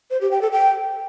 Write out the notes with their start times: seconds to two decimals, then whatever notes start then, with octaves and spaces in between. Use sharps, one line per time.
0.11 C5
0.21 G4
0.31 G5
0.42 A4
0.52 G5